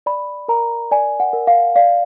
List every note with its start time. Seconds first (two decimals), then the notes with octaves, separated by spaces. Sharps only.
0.06 D5 B5
0.48 A#4 A#5
0.91 D5 G#5
1.20 F#5
1.33 A#4
1.47 F5
1.76 D5 F5